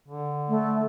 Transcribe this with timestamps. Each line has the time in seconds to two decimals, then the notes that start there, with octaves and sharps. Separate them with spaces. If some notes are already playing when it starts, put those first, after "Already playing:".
0.08 D3
0.49 A3